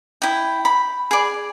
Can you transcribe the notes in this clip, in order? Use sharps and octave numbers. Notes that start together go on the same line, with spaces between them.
E4 G5
B5
G#4 D5